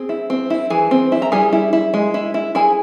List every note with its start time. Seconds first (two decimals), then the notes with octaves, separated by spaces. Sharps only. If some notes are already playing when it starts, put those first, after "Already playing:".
Already playing: C4 G#4
0.09 E4
0.30 C4
0.50 E4
0.70 E3 G#4 G#5
0.91 C4
1.12 E4
1.22 A#5
1.32 G3 G#4 G#5
1.53 E4
1.73 E4
1.94 G#3
2.14 E4
2.34 E4
2.55 E4 G#4 G#5